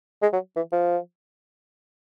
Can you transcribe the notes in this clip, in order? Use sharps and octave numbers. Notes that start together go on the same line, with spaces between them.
G#3
F#3
E3
F3